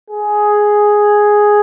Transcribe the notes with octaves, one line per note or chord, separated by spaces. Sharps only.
G#4